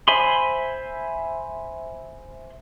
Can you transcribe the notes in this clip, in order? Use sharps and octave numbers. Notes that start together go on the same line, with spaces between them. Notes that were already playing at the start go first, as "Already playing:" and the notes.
C5 E5 G#5 B5 C6